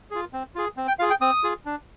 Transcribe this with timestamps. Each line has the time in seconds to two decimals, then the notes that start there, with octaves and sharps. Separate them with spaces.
0.10 F4 G#4
0.33 C4
0.55 F4 G#4
0.77 C4
0.88 G5
0.99 F4 G#4 F5
1.10 G5
1.21 C4 D#6
1.43 F4 G#4
1.65 D4